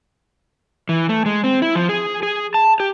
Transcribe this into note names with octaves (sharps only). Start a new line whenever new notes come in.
E3
A3
G#3
C4
E4
F3
G#4
G#4
A5
G4